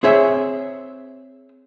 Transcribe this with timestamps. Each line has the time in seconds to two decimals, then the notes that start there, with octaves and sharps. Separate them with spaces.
0.03 C4 G#4 C#5 E5